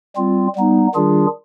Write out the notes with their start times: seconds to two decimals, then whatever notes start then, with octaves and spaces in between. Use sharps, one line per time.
0.16 G3 C4 F4
0.55 G3 B3 D#4
0.95 D#3 G3 D4 F4 G#4